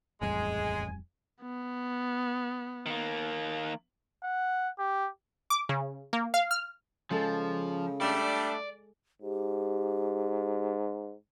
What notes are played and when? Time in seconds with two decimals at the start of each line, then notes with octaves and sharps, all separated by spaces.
0.22 D#1 A1 F2 G3 G#3 G#5
1.42 B3
2.86 D#3 A#3
4.23 F#5
4.79 G4
5.50 D6
5.69 C#3
6.13 A#3
6.34 F5
6.51 F6
7.11 C#3 F3 G#3 A4
8.01 G3 A3 D4 D5
9.22 G#2 G4